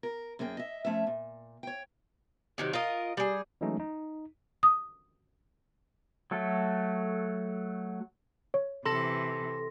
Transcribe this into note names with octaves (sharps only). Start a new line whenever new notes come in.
A#4
F#2 A#3 G#4 A4 G5
D#5 E5
F3 A3 C#4 E5
A#2
C#5 G5
C3 D#3 F#3
F4 A#4 D#5
G3 G#4
E3 F#3 G#3 A3 C#4 D#4
D#4
D#6
F#3 A3 A4
C#5
C3 E3 A4 C6 A#6